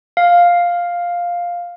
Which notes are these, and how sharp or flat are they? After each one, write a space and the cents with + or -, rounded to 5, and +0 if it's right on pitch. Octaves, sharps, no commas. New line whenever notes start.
F5 +5